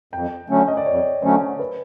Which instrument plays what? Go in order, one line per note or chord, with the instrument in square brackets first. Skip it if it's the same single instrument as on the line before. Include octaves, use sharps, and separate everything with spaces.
[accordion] F2 [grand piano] G5
[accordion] D3 F#3 A3 C#4
[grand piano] D#5
D5
[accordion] F2 [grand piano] C#5
[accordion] D3 F#3 A3 C#4 [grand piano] C5
[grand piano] B4